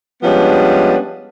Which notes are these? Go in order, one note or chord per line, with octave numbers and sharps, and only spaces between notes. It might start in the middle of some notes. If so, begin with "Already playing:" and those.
F3 G3 G#3 B3 C#4 D4